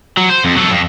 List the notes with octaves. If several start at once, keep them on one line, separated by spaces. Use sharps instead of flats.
F#3
C5
F2
F#3 A4
F2